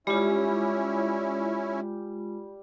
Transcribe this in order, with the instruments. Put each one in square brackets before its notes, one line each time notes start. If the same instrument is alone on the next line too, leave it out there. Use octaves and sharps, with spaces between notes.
[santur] G3 [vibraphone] G#3 F4 [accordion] C#4 E4